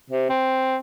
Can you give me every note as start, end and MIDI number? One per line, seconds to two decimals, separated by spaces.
0.11 0.27 48
0.30 0.77 60